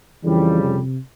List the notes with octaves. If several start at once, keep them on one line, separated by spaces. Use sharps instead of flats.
F2 C#3 E3 G3
C3